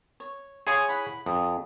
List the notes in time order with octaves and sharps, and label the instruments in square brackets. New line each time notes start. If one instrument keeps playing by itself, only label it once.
[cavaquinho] C#5
[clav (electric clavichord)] G#4 C#5 G#5 [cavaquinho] F5 C6 D#6
[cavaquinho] E4 F#5 B5
[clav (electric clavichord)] F2 [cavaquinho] D#6